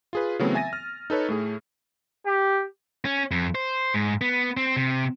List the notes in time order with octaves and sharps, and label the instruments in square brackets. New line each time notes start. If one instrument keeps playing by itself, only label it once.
[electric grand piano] F4 G#4 B4
C#3 E3 F#3 A3 B3 C4
E5 G#5 A6 A#6 D#7
F6
D#4 A4 B4 C#5
A2 A3 G#4
[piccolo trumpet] G4
[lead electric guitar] C#4
F2
C5
G#2
B3
C4
C3